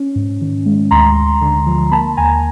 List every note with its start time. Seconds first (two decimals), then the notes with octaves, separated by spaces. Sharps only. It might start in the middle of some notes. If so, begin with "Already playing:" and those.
Already playing: C#4
0.16 G#2
0.41 D#3
0.66 G#3
0.91 D2 A#5 C6
1.17 D2
1.41 D3
1.66 F3
1.91 A#3 A5 B5
2.17 D#2 G#5 A#5